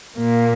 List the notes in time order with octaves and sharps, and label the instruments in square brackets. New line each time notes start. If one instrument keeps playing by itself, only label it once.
[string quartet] A#2 A#3